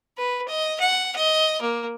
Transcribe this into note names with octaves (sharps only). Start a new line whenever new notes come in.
B4
D#5
F#5
D#5
A#3